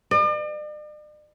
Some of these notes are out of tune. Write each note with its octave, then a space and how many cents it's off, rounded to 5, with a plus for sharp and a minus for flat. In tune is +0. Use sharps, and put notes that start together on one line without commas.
D5 +45